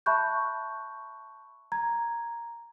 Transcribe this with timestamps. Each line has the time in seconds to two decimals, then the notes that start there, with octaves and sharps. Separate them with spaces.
0.06 E5 A5 B5 C#6 F#6 G6
1.72 A#5 G#6